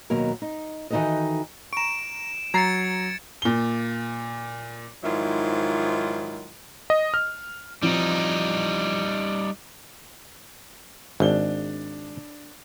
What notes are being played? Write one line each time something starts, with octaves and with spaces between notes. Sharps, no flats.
D#2 B2 F#3 A#3 A#4
D#4
D#3 E3 D#4 F#4 A4 D#5
A#5 C#6 D7 E7
F#3 A#5 G#6 A6 C7 C#7
A#2 G7
G#2 D#3 F3 F#3 E4 F4
D#5
F6
E3 F3 G3 C4 D#4
G#1 D4 G7